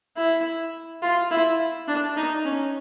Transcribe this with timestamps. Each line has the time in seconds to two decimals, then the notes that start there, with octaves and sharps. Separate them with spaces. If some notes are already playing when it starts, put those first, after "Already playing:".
0.17 E4
1.02 F4
1.31 E4
1.88 D4
2.17 D#4
2.45 C#4